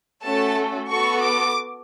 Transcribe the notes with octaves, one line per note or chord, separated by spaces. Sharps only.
A3 C#4 F#4 A4 A5
B3 F#4 A4 C#6
D6